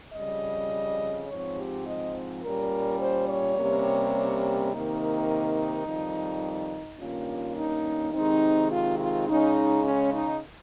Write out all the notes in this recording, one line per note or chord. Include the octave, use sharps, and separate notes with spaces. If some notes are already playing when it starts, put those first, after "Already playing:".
F2 C#3 G3 D#5
G#2 F3 C4 C#5
G4
D#5
A#2 G3 C#4 A#4
C5
C#5
C3 G3 A#3 C#4
C3 D#3 A#3 D#4
F2 D#3 G3
G2 D#3 A#3 C#4 F4
D#4
C3 D#3 G#3 C4 D#4
F4
F4
C#3 G#3 C#4 D#4
C#4
D#4